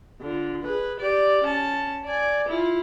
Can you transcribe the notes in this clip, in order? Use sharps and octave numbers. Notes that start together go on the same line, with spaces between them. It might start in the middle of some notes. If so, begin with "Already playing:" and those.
D3 F4
G#4 B4
G4 D5
C#4 A5
D5 G#5
E4 F4